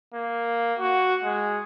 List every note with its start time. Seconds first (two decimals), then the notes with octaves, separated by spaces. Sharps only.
0.14 A#3
0.79 F#4
1.24 G#3